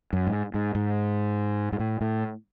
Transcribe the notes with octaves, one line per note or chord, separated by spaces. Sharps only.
F#2
G#2
G#2
G#2
G#2
A2
A2